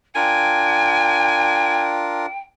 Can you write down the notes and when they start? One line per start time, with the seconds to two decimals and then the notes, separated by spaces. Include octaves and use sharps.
0.16 D4 F4 A#4 G5 G#5